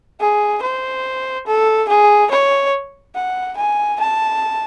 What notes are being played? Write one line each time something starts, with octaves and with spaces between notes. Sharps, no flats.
G#4
C5
A4
G#4
C#5
F#5
G#5
A5